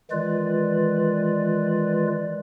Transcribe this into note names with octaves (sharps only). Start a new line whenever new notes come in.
D#3 E3 G#3 F4 B4 D5